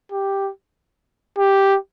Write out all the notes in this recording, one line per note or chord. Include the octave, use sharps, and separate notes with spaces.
G4
G4